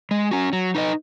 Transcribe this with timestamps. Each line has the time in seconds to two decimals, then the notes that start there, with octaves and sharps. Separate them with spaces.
0.11 G#3
0.31 C#4 F#4
0.53 F#3
0.75 D#4 B4 D#5